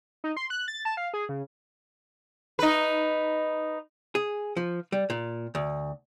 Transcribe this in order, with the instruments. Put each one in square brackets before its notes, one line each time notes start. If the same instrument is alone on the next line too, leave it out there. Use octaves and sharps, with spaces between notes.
[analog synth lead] D#4
C6
F#6
A6
A5
F5
G#4
C#3
[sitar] D#4 B4
[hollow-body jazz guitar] G#4
F3
G3
A#2
D2